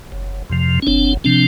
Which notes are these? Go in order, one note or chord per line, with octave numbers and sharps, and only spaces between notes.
F#1
F2 C3 F3
C#4
F#1 C4 D4
C3 F3 C4 D4